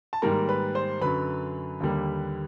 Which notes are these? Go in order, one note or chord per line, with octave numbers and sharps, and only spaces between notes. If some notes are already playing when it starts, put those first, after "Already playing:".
A5
G#2 D#3 G3 A#3 A#4 A#5
B4 B5
C5 C6
F#2 D3 F#3 B4 B5
D#2 D3 G3 A#3